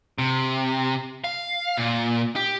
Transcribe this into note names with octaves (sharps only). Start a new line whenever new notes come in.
C3
F5
A#2
G4